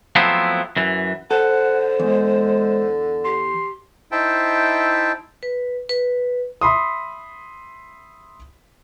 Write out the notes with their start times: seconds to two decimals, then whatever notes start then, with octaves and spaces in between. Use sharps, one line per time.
0.16 F3 F#3 A3 B3 C4 E4
0.77 F#2 E3
1.31 D3 A4 C5 F#5
1.99 E2 G#3
3.25 G4 C6
4.12 D#4 E4 C5 E5 G5 A5
5.43 B4
5.89 B4
6.61 E5 B5 C6 D#6